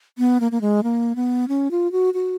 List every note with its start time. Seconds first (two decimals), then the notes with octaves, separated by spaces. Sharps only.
0.18 B3
0.40 A#3
0.52 A#3
0.61 G#3
0.83 A#3
1.16 B3
1.48 C#4
1.71 F4
1.92 F#4
2.14 F#4